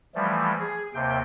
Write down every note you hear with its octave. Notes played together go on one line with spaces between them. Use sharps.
E3 F3 G3 A3
G#4
D#2 C3 G5